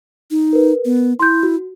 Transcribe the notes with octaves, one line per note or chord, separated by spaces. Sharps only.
D#4
A#4 B4
B3
E4 C6 G6
F#4